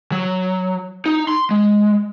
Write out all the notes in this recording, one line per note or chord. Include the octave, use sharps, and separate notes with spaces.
F#3
D#4
C6
G#3